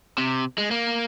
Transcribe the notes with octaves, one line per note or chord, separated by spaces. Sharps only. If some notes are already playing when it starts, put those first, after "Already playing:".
C3
G#3
A#3